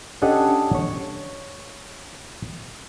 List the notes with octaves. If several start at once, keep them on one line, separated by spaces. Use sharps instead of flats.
C#4 D4 G4 A4 D#5 F#5
C#5